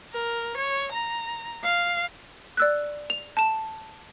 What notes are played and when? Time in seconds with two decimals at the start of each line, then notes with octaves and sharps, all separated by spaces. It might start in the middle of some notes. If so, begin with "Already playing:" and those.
0.13 A#4
0.57 C#5
0.92 A#5
1.64 F5
2.57 D5 E6 F#6
3.10 F7
3.37 A5 E7